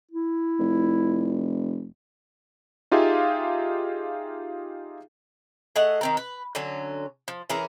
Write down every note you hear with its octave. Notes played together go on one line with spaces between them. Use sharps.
E4
F1
D#4 F4 G4 G#4 E5 F5
A3 G#4 D#5 F#5
D#3 C4 A#4
B4
D3 F#3 C#4
F3
E3 C#4 G#4 A#4